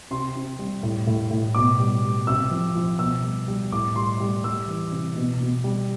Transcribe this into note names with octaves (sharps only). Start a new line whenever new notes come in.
C3 C6
C3
G3
A2
A2
A2
B2 D6
G3
G3
C3 E6
F3
F3
B2 E6
G3
G3
A2 D6
G3 C6
G3
G3 E6
E3
C3
B2
B2
G3